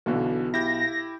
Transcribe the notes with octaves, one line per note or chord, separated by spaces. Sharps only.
B1 B2 D3 E3 F#4
E4 G4 G6 A#6